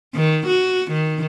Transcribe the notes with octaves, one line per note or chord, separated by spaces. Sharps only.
D#3
F#4
D#3